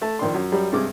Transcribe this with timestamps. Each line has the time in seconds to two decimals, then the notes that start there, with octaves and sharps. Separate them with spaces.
0.02 A3 A5
0.19 A#1 D#3 D4 C6
0.34 F#2
0.52 F#2 G3
0.72 G2 C3 G#3 D6